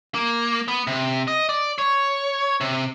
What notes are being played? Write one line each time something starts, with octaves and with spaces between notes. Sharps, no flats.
A#3
B3
C3
D#5
D5
C#5
C3